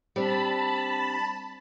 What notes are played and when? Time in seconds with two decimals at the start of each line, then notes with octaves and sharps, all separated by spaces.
0.16 G3 C4 D4 A5 B5